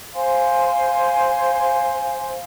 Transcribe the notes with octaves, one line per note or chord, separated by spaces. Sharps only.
C5 F5 G#5 C6